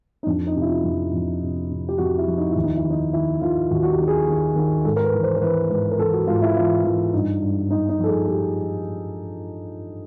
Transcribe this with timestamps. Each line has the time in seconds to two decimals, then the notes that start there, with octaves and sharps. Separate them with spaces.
0.23 D#4
0.27 F2 D4
0.47 D#4
0.56 C3
0.62 E4
0.65 F4
0.84 F2
1.13 F2
1.42 C3
1.70 C3
1.89 G4
1.98 F2 F#4
2.18 E4
2.28 F3
2.37 D#4
2.50 E4
2.56 D#2
2.64 D#4
2.77 E4
2.84 D#3
2.90 D#4
3.13 D#3 E4
3.41 D#3 F4
3.71 D#2 F#4
3.83 F#4
3.90 G4
3.99 D#3
4.08 G#4
4.28 D#3
4.56 D#3
4.84 G#2 A4
4.96 A#4
5.04 B4
5.13 E3
5.23 C5
5.36 A#4
5.42 E3 B4
5.70 G#2 B4
5.91 A#4
5.99 E3 A4
6.13 F#4
6.27 G#2 F4
6.42 E4
6.56 E3 F4
6.84 E3 E4
7.13 G2 D#4
7.42 G2
7.70 G2 D#4
7.89 D#4
7.99 F3 A4
8.08 G#4
8.28 G4